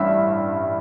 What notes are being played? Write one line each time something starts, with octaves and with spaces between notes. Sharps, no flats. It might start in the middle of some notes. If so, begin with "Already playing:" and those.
Already playing: A1 G2 E3 E5